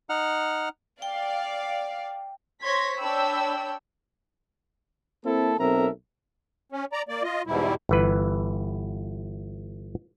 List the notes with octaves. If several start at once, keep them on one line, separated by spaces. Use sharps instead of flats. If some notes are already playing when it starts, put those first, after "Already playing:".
D#4 F#5 F6
D5 F5 G5
C5 C#5 C6 G#6 A#6 B6
D4 C#5 G5 B5 E6
A#3 C4 E4 A4
B1 C4 A4 A#4 E5 A#5
C#4
D5 A#5
A#3 D5
F4 D#5
E2 G#2 B2 G3 E4
G1 E3 B4